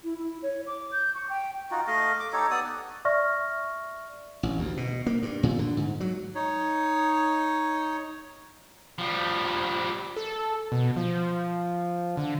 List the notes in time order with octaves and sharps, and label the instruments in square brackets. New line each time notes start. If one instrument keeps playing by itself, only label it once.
[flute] E4
E4
C#5
D6
G6
C#6
G5
[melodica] D#4 F4 F#4
A3 D#5 F5
D6
D#4 G4 A4 C#5
B3 D5 D#6
F#5
[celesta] D5 E5 C#6 F6 A#6
[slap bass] A1
D2
B2
A#3
G2
A#2
D3
G#2
F#3
[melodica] D#4 C#5
[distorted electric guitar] F3 G3
[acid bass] A4
B2
F3
D3